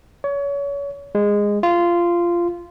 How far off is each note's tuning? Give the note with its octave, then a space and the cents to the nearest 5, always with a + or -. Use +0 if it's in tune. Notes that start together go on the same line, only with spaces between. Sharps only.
C#5 +30
G#3 -15
F4 -15